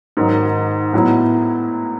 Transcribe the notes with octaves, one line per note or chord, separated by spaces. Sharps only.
G#2 D#3 F#3
A2 F#3 B3 E4